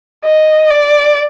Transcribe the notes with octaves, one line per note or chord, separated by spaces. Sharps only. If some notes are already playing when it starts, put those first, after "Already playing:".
D#5
D5